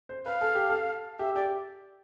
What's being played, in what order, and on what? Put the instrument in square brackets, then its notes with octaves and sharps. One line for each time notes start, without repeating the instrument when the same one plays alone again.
[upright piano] C5
[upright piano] B4 [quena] F5
[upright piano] A4
G4
A4
[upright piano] G4 [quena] E5
[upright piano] G4 [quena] D5